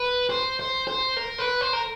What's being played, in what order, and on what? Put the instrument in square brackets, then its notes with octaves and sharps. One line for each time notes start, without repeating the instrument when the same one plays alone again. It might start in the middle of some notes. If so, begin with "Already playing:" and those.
Already playing: [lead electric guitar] B4
C5
C5
C5
A#4
B4
C5
A#4